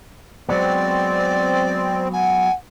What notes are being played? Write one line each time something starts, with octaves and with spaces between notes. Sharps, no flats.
F#3 G#3 B3 C4 D5
F#5 G#5